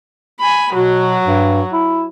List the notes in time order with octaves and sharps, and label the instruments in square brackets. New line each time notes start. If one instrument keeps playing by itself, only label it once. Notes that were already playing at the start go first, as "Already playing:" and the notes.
[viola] G#5 B5
[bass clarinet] B2 [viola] F#3 F#4
[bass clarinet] G2
E4